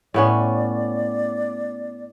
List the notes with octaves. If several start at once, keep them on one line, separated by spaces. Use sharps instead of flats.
A2 B3 C#4 D5